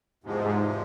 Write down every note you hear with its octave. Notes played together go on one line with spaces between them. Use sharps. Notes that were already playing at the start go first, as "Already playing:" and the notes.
E2 G#2 C3 F3 G#3